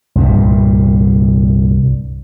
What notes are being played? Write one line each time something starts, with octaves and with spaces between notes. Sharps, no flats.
C2 G2 A#2